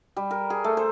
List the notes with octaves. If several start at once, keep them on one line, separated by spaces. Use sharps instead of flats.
G3
A#4
G#4
A3
C5